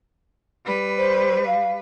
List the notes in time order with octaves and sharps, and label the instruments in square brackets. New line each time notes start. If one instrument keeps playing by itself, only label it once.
[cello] G3 B4
[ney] C5
F5